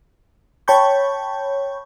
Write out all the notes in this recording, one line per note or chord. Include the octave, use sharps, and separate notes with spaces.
C#5 G5 A5 B5 C#6 G6